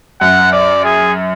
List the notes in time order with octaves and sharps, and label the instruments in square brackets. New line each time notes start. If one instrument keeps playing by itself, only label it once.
[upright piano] F#2 [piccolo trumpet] F#5
[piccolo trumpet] D5
G#4